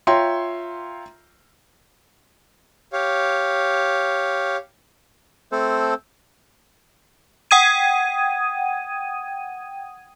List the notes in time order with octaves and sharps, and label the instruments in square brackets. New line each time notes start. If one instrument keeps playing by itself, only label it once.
[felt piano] F4 C#5 E5 G5 A#5 C6
[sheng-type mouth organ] G4 C#5 F5
[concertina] A3 C4 A4 C5
[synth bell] F#5 G5 D#6 G#6 D#7